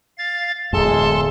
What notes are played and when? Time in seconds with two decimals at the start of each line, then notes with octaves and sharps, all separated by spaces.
0.18 F5 A6
0.73 D1 E2 G#3 G#4 A4 A5 C6